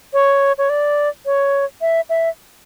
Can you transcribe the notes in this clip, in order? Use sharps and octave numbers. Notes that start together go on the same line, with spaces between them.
C#5
C#5
D5
C#5
E5
E5